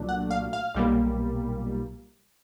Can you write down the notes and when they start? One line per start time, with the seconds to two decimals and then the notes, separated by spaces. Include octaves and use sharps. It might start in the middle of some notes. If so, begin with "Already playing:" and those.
Already playing: C2 A#2 F#3 A3 D4
0.09 F#5
0.31 F5
0.53 F5
0.75 B1 A#2 G3 A#3